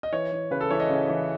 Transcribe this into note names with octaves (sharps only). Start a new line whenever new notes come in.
D#5
E3 C#5
E3
C#3 B4
A4
E3 C#5
D#5
C#3
E3